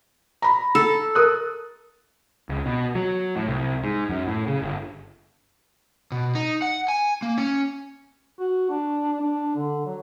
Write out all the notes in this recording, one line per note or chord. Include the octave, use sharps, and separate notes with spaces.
A#5 B5
A4
A#4 D#6 F#6
C#2
B2
F#3
A2
C2
G#2
F#2
A2
C#3
G1
B2
D#4
F#5
G#5
A#3
C#4
F#4
D4
D4
D3
F#3